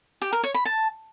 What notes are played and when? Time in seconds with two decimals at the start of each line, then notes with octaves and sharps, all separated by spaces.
0.22 G4
0.33 A#4
0.43 C#5
0.54 B5
0.65 A5